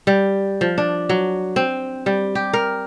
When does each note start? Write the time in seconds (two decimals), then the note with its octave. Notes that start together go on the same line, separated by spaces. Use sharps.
0.07 G3
0.61 F3
0.78 D4
1.09 F#3
1.56 C4
2.06 G3
2.35 G4
2.53 A#4